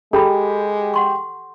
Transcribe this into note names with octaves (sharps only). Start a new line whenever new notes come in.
G#3 G4 A4 A#5 B5
F#5 C6 C#6